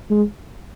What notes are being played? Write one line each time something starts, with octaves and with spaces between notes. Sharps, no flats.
G#3